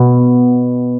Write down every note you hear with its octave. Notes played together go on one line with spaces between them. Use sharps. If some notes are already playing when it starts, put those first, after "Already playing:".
Already playing: B2